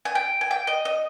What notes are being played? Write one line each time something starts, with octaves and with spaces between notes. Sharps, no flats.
G#5
G5
G#5
G5
D#5
D#5